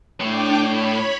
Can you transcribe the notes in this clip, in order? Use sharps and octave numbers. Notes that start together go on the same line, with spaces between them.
A2 A3 D4 G5 D6
C#5 B5